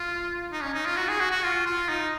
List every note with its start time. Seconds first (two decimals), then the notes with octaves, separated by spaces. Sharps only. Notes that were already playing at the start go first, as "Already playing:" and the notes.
Already playing: F4
0.52 D#4
0.63 C#4
0.74 D#4
0.86 F4
0.97 F#4
1.09 G#4
1.20 F#4
1.31 F#4
1.44 F4
1.66 F4
1.89 D#4